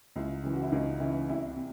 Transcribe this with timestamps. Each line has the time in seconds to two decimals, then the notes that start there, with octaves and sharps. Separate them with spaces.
0.16 C#2 E4
0.43 C#3 E3
0.53 F#4
0.62 E4
0.72 C#2 D#4
1.00 C#3 E3 E4
1.29 C2 E4
1.56 C3